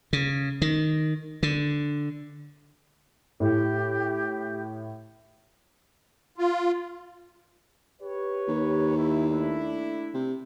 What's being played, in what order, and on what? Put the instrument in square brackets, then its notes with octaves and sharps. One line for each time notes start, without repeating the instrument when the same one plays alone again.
[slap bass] C#3
D#3
D3
[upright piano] A2 [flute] G4
[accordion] F4
[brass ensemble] G4 B4 C#5
[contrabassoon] D#2
[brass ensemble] E4
A3 D4 E4
[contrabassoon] C3